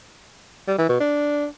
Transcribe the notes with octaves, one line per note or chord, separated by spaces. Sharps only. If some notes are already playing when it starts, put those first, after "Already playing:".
G3
E3
B2
D4